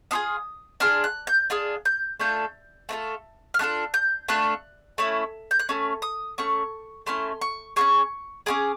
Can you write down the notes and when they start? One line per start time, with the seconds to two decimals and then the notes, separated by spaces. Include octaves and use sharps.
0.11 D4 F4 G#4 D#6
0.80 D4 F4 G#4 F6
1.04 F#6
1.27 G6
1.50 D4 F4 G#4
1.85 G6
2.20 A3 D4 F4 A4 G6
2.89 A3 D4 F4 A4
3.54 F6
3.59 A3 D4 F4 A4 F#6
3.94 G6
4.28 A3 D4 F4 A4 F#6
4.98 A3 C#4 E4
5.51 G6
5.59 F#6
5.69 A3 C#4
6.02 D#6
6.38 A3 C#4 C#6
7.06 A3 C#4 E4 C6
7.41 C#6
7.76 C#4 F4 G#4 C#6
8.46 C#4 F4 G#4 D6